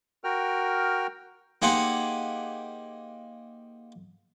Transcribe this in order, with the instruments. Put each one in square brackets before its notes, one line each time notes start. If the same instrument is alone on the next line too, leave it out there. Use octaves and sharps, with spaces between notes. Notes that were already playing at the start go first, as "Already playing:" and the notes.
[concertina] F#4 A#4 G5 F6
[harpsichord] A#3 D#4 G4 G#4 C5 F#5